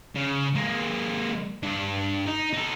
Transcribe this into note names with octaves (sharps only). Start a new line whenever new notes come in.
C#3
G#3 A#3
G2 D4
D#4
D#4 A4